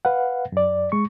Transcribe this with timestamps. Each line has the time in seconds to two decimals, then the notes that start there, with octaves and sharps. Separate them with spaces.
0.05 B4 F5 F#5
0.52 F#2 D5
0.92 G#3 C#6